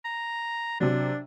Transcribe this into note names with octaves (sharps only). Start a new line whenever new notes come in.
A#5
C3 F#3 D4